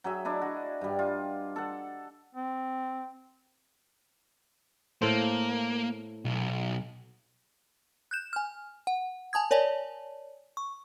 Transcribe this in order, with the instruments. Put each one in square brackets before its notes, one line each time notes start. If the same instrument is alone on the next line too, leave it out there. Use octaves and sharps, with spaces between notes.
[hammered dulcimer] F#3 G#4 E5
D4 E4 D#5
F#4
G2 G3
F4
A4 F#5
[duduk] C4
[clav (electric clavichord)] A2 A4 C5 [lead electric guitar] A#3
[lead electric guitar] B1
[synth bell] F#6 G6 E7
G#5 F6
F#5
G#5 A5 D#6 G#6
A#4 C#5 D5 G#5 A5
C#6